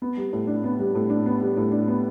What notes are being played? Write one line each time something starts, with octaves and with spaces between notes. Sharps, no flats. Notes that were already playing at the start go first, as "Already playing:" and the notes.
B3
G3
A2
D4
B3
G3
A2
D4
B3
G3
A2
D4
B3